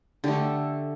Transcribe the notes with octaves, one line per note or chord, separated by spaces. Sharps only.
D3 A3 G4